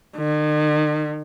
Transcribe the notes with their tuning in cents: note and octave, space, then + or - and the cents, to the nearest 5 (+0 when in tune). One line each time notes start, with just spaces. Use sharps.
D#3 -45